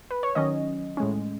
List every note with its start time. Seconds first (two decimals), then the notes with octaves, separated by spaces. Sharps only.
0.11 B4
0.23 C#5
0.35 D#3 F#3 C#4 D#5
0.97 A2 G#3 C#4